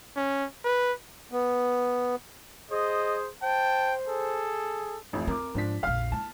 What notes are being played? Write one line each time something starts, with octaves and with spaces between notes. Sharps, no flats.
C#4
B4
B3
G#4 C5 D#5
C5 G5 A5
G#4 A4
A1 F2 A2
C4 A#4 D6
G#2 F3 D4 B6
A#1 F2 F5 F6
A#3 E4 A5